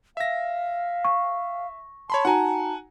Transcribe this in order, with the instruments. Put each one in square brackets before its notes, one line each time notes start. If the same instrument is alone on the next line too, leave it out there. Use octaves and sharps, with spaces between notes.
[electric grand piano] E5 A#6 [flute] F5
[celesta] C#6
[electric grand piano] C#5 B5 C6 [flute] A5
[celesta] D#4 F#4 A#5 [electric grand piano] F#5 G#5